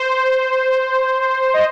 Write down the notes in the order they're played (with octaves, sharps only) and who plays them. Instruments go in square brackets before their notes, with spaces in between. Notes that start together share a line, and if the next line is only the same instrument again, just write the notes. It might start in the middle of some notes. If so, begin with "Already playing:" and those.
Already playing: [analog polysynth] C5
D#5